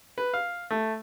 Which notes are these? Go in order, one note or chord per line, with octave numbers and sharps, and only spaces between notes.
B4
F5
A3